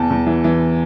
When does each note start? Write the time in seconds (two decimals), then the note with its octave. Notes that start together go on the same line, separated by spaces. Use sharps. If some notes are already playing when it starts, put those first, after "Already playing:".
Already playing: E2 A5
0.10 E2
0.27 E3
0.44 E3